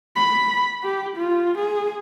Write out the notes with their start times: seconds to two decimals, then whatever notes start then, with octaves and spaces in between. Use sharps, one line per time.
0.16 B5
0.83 G4
1.17 F4
1.59 G#4